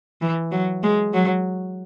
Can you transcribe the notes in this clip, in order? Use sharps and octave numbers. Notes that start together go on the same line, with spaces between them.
E3
F#3
G#3
F#3